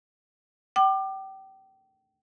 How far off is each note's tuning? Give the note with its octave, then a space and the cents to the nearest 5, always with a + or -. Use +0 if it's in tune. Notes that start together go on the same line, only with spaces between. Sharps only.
G5 -30 D6 +30